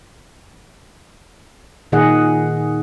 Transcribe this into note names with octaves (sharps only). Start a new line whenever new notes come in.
A#2 D#3 G#4 D#5 F#5